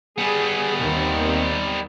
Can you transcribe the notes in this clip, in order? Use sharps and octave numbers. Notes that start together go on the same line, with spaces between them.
G3 B3 G#4
D#2 D#3 C4